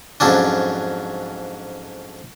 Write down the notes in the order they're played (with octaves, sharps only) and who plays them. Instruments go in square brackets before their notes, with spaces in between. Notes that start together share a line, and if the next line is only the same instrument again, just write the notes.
[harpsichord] F2 G#2 F#3 C#4 D4